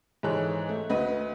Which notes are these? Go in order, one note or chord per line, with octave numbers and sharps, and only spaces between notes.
G#2 E3 A4 C#5 F#6
A3
D2 B4 D#5